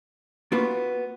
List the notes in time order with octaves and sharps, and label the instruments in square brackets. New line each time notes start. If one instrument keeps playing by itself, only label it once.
[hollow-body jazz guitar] A#3 B3 F4 F#4 B4